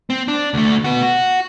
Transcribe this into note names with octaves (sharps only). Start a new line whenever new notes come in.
C4
D4
D2 A3
B3 F#4
F#4